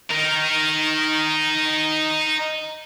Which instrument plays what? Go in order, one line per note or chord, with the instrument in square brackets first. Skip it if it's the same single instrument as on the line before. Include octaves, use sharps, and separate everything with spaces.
[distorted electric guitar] D#4 A#4